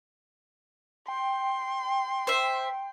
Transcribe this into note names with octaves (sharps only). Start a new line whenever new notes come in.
G5 C6
C5 E5